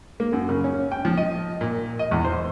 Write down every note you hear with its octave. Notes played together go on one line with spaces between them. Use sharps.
A#3
F#2
C#3
C#4
G5
F3
D#5
A#2
D#5
E2
C5